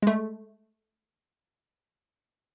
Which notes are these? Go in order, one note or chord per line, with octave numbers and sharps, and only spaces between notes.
G#3 A3